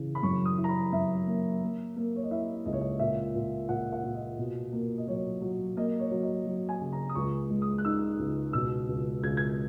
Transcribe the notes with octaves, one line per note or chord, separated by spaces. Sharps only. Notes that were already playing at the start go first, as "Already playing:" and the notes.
Already playing: C#3 E3
B5
F#2 C#6
D#6
E4
A#5
B5
F#2 E5
A#3
A#3
A#3
C#5
D#5
E4 E5
C#2 D#5
C#5
D#5
A#2 E5
A#2
A#2 F#5
F#5
A#2
D#5
B2
A#3
D#5
F#3 C#5
F#3
A#3 D#5
C#5
F#3
D#5
F#3
G#5
C#3
A#5
D#6
C#2 C#6
G#3
D#6
F#6
D#4 E6
C#2
B2 E6
C#2
C#2 G#6
G#6